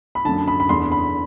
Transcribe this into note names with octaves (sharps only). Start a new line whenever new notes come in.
B5
F#2 D3 A5
B5
B5
E2 D3 C6
B5